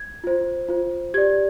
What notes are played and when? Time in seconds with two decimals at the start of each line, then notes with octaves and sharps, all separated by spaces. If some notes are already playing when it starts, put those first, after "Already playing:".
Already playing: G#6
0.24 F4 C5
0.69 F4 C5
1.14 G4 D5 G#6